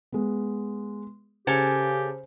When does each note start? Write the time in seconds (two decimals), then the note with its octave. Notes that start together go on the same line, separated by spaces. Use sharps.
0.12 G#3 B3
1.47 C#3 G4 A4 A#4 C5 G#5